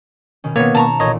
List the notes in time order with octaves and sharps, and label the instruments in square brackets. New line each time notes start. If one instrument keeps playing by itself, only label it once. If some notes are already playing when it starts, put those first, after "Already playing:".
[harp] B2 D#3 C#4
[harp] B2 D#3 [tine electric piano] A#3 B3 [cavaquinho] C#5
[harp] B2 [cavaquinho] A5 A#5 C#6
[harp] A1 A#2 [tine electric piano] C#5 D#5